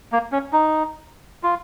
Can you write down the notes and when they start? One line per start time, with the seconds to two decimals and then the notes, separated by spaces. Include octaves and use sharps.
0.12 A#3
0.32 C#4
0.53 D#4
1.43 F4